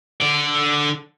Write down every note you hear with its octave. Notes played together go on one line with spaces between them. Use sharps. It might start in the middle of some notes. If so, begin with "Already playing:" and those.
D3 D5